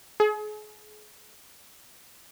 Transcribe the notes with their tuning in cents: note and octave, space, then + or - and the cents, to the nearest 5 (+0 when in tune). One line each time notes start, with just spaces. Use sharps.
G#4 +35